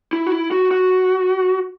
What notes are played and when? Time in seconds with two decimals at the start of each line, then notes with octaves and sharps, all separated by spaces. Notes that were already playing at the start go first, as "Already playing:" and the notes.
0.13 E4
0.26 F#4
0.32 E4
0.51 F#4
0.71 F#4